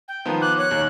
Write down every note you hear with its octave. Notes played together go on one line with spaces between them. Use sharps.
G5
D#3 F3 B3
D6 F#6
C#5 F#6
D#2